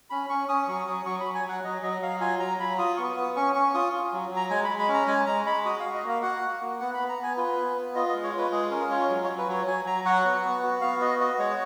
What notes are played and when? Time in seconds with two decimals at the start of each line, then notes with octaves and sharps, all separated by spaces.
0.10 C#4 B5
0.29 C#4 C#6
0.49 C#4 D#6
0.68 F#3 C#6
0.87 F#3 D#6
1.06 F#3 C#6
1.20 B5
1.25 F#3
1.35 G#5
1.44 F#3 F#5
1.64 F#3 D#5
1.82 F#3 D#5
2.02 F#3 F5
2.21 F4 G#5
2.40 F#3 A#5
2.60 F#3 B5
2.78 F4 D#6
2.97 B3 C#6
3.17 B3 D#6
3.36 C#4 C#6
3.55 C#4 C#6
3.74 F4 D#6
3.93 F4
4.13 F#3
4.31 F#3
4.36 A#5
4.50 G#3 G#5
4.65 G#3 B5
4.79 B5
4.88 C#4
4.94 A#5
5.07 G#3 G#5
5.26 G#3 A#5
5.46 G#3 B5
5.65 F#4 D#6
5.80 F#4 F5
5.94 D#5
6.04 A#3
6.09 F5
6.22 F#4 F#5
6.42 F#4
6.61 A#3
6.80 B3 F#5
6.94 B3 B5
7.09 A#5
7.18 B3 G#5
7.37 F4 B4
7.57 B3
7.76 B3
7.95 F4 D#5
8.09 G#3 D#5
8.23 C#5
8.33 F4 B4
8.52 G#3 G#4
8.71 C#4 A#4
8.90 F4 C#5
9.09 F#3
9.24 C#5
9.29 F#3
9.38 B4
9.48 F#3 C#5
9.67 F#3 G#5
9.85 F#3 A#5
10.05 F#4 F#5
10.25 B3
10.44 B3
10.63 F#4
10.81 B3 F5
11.00 F#4 D#5
11.20 F#4 D#5
11.39 G#3 C#5